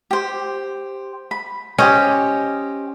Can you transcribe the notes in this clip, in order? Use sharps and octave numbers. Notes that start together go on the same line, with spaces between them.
G4 C5
B5
C#4 G4 C5 D#5